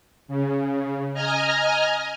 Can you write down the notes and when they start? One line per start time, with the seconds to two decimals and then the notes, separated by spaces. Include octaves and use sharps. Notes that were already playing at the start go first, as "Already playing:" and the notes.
0.28 C#3
1.14 D#5 G#5 A#5 F6